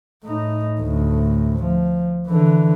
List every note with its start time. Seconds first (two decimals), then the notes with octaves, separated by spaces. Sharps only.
0.24 A2 D#4
0.81 D2 A2
1.63 F3
2.27 D3 E3